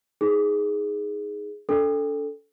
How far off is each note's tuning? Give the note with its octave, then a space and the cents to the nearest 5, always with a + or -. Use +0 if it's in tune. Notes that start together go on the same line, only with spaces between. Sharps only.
D#4 +10 G#4 +0
D4 -35 A4 +0